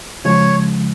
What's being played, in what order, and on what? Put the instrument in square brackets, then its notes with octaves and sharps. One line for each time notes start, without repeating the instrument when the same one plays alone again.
[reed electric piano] C#3 F3 G#3 [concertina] C#5